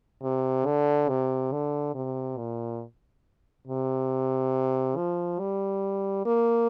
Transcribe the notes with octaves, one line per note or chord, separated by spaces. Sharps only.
C3
D3
C3
D3
C3
A#2
C3
F3
G3
A#3